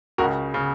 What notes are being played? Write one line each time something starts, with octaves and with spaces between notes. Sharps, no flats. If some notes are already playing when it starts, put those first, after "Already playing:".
C#2 C#3 F#4 A#4
C#3